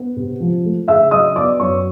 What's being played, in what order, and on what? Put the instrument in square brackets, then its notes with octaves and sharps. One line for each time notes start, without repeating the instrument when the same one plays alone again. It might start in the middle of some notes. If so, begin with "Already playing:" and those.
Already playing: [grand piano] B3
C3
F3
A3
[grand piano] C#3 [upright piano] E5 E6
[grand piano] F#3 [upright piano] D#5 D#6
[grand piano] B3 [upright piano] D5 D6
[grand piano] F#2 [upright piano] C#5 C#6